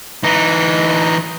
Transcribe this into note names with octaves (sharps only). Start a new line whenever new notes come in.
E3 D#4